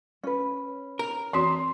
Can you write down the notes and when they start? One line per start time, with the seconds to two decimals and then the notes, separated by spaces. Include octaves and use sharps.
0.24 C#4 B4
0.99 A#4
1.33 E3 C4 F#4 C6